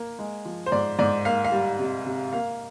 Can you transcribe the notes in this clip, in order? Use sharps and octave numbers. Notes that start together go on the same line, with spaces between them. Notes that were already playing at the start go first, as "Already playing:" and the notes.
Already playing: A#3
G#3
F3
C5
G#2 D5
G#2 D5
A#3 F5
F5
G3
C3
C3
A#3 F5